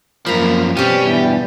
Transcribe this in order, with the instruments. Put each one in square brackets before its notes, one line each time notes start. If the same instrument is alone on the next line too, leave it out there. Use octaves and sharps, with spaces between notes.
[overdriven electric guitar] F#2 F3 [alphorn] A#3 [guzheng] A#5 B5
[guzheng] B2 G3 [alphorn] C4 [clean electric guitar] C#4 [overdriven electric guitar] G4
[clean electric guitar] E2 G2 [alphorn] E4